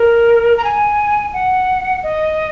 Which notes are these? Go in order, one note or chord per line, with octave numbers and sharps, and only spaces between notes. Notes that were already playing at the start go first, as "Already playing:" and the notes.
Already playing: A#4
A#5
G#5
F#5
D#5